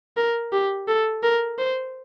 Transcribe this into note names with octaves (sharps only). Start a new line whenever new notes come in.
A#4
G4
A4
A#4
C5